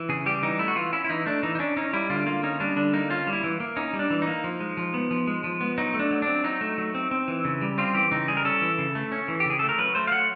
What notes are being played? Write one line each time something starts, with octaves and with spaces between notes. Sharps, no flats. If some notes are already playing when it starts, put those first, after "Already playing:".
Already playing: E3
C#3 G#4
G3 G4
E3 D#4
A3 E4
F#4
E3 F4
C#4 E4
E4
E3 D#4
A3 D4
E3 D#4
D#4
C#4 D4
C#4 D#4
G3 E4
D3 F4
A#3 F4
C#4 D#4
G3 D4
D3 D4
A#3 D#4
C#4 F4
G3
E4
E3
A#3
C#4 D#4
G3
D4
E3
D#4
A#3
F3
G#3
F3
B3
F3
G#3
F3
B3
F#3 D#4
A3
D4
F#3
D4
C4
F#3 D#4
A3
F#3
C4
C4
E3
C#3
G3
C4 F4
E3 G4
C#3 D#4
G3 G#4
A#4
C#4 A4
E3
C#3
A3
C#4
E3
G4
C#3 G#4
A3 A4
A#4
F#3 B4
A3 C5
F5
F#3 F#5